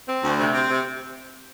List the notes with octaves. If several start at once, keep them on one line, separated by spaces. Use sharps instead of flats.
C4
D2
C3
C4
C3